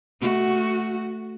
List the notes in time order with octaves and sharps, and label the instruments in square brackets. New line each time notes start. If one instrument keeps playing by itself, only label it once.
[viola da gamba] A3 F#4